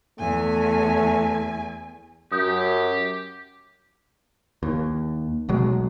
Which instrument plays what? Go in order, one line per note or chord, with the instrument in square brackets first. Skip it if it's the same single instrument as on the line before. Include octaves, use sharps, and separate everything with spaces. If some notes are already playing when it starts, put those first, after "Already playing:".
[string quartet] E2 [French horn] A3 [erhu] G#5
[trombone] F#2 [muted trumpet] G4 [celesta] D#6 G6
[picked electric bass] D#2
B1 B2 F#3 G#3